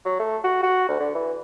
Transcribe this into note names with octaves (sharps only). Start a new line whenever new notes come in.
F#3
A3
F#4
F#4
D2
D3
E3